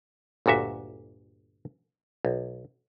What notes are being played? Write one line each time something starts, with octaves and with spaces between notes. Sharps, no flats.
G1 D2 A#2 F#4 E5
B1